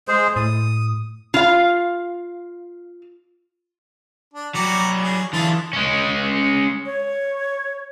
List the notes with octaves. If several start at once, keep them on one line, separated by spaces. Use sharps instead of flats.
G#3 G#4 C5
A2 D#6
F4 F5
D4
F#3 G3 F#4 D5 F#5 A#5
G#4
D3 E3 F4 G#4 A5
G#3 C#4
C#5